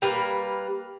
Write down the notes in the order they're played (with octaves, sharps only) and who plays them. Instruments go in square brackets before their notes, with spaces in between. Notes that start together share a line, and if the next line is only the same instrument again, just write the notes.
[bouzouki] G3 A#3 B4